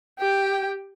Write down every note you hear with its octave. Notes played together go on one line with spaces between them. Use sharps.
G4 G5